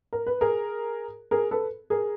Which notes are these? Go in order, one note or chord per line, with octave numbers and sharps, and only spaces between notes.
A#4
B4
G#4 A#4
G#4 A#4
A4 B4
G#4 A#4